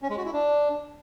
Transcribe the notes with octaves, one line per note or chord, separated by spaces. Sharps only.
C#4
G#3
F#4
E4
D4